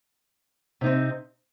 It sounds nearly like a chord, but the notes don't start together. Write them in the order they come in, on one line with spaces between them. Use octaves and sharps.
C3 D#4 C4